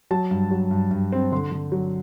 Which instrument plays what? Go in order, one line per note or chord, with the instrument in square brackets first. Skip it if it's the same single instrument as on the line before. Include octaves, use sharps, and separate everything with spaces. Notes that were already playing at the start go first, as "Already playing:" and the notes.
[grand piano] F#3 A5
G2
F#3
G2
G2
C4
D3 C6
D3
F#3